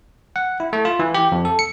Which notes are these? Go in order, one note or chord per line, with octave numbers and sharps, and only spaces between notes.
F#5
E4
A3
F4
E3
G4
F2
A4
C#7